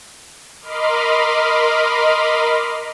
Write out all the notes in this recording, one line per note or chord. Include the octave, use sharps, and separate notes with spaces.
A#4 D#5 B5 C6 D6 F6